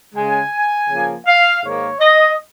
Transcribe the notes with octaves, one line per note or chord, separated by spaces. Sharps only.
C#3 G#3 G#5
C#3 F3 A#3
F5
G#2 D#3 A#3 C#5
D#5